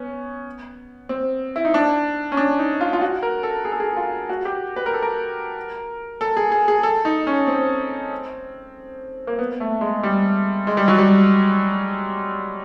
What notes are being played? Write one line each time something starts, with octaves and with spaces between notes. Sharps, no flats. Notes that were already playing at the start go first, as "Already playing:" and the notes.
Already playing: B3 C#4
C4
E4
D#4
D4
C#4
D4
D#4
F4
F4
F#4
A#4
A4
G#4
A4
G#4
F4
F#4
G4
B4
A#4
A4
A#4
A4
G#4
G#4
G#4
A4
D#4
C#4
C4
A#3
B3
A3
G#3
G3
G#3
G3
F#3
G3